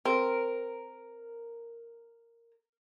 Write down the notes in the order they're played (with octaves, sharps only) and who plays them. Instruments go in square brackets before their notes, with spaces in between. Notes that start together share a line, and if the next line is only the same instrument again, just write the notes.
[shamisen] C4 [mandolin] A#4